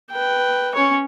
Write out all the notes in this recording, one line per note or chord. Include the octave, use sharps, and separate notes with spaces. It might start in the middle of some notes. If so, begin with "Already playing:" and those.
B4 G5
C#4 C#5